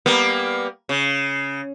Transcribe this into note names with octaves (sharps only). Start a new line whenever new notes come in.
G3 A#3 B3
C#3